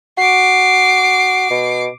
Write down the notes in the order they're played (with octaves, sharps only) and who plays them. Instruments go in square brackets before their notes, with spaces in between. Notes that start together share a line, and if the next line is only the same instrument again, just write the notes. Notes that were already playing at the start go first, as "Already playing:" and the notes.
[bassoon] F#4 [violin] D6 C7
[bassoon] B2